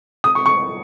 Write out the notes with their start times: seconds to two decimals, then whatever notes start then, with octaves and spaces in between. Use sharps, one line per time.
0.24 D#6
0.35 C#6
0.46 C#6